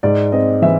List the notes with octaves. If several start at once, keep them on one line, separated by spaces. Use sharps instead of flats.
G#2 D5
C4 D#5
E3 E5